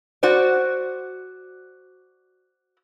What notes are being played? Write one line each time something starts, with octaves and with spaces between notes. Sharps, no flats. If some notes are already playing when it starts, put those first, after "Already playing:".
F#4 C5 D5